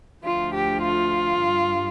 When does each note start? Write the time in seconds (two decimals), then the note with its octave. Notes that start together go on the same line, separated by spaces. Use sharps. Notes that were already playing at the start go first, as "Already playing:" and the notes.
0.24 D2 D3 F3 A3 F4
0.53 G4
0.82 F4
1.40 G2
1.46 G3